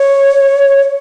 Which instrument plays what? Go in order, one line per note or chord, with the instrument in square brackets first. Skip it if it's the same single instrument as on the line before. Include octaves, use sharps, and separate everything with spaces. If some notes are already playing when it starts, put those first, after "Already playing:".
Already playing: [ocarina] C#5